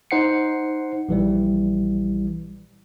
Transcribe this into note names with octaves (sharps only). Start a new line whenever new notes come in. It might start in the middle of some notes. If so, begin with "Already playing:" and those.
D#4 C5 F#5 C7 C#7
A#1 E3 G3